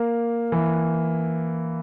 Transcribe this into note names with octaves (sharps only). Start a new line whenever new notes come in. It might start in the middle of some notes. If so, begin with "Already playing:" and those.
Already playing: A#3
E3